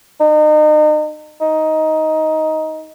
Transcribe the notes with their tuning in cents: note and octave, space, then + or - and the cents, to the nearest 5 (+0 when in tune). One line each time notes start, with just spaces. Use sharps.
D#4 -35
D#4 +15